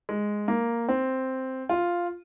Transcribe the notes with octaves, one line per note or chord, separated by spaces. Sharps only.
G#3
A#3
C4
F4